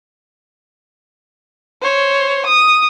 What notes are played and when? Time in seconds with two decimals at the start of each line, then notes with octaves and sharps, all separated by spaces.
1.82 C5 C#5
2.46 D#6